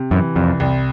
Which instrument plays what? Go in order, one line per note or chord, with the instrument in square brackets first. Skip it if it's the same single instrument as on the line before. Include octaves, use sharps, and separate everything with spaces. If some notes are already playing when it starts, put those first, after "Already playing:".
Already playing: [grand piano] C3
[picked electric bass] F#2 [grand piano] E3
[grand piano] C2 [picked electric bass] F2
[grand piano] C2